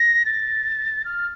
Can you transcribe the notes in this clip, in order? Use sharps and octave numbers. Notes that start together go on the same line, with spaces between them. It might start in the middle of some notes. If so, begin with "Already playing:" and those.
Already playing: A#6
A6
F6